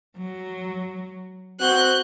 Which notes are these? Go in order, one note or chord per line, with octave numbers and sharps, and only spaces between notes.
F#3
C4 F#4 F#6 G6